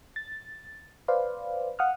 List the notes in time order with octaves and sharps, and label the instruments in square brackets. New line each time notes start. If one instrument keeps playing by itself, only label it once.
[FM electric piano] A6
B4 C5 D5 F5
F5 F#5 D#6 F6